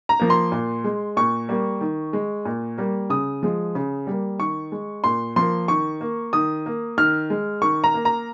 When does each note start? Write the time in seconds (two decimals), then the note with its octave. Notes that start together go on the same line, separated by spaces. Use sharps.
0.09 A#5
0.20 F3 A#3
0.30 C6
0.52 A#2
0.84 G#3
1.17 A#2 C#6
1.49 G3 A#3
1.81 D#3
2.13 G#3
2.45 A#2
2.78 G3 A#3
3.10 C#3 D#6
3.43 F3 G#3
3.75 C#3
4.07 G3 A#3
4.39 D#3 C#6
4.72 G#3
5.04 A#2 C6
5.36 F3 A#3 C6
5.68 D#3 C#6
6.01 A#3
6.33 D#3 D#6
6.66 A#3
6.98 D#3 F6
7.30 G#3
7.62 D#3 C#6
7.84 A#5
7.94 A#3
8.05 A#5